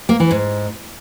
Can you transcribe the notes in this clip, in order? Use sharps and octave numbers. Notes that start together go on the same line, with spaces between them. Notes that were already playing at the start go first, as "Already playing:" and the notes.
A#3
E3
G#2